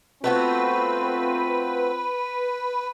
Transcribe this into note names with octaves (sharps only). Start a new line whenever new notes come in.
A3 B3 C4 F4 F#4 B4